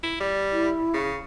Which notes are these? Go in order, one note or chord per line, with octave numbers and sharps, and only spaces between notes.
E4
G3
E4
C#3